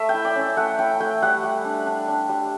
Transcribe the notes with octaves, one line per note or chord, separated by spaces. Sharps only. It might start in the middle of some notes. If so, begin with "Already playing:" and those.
Already playing: A3 E5
G5
E4
D5
C#4
E5
A3 F#5
E4 G5
A3 G5
G3 F#5
G3
D4
D4
D4
G3